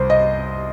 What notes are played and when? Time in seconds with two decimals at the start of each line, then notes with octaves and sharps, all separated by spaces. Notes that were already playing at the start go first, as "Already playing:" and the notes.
Already playing: C2 C5
0.10 D#5